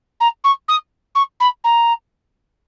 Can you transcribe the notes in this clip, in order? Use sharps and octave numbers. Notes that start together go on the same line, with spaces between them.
A#5
C#6
D#6
C#6
B5
A#5